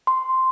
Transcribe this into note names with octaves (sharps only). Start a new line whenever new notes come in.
C6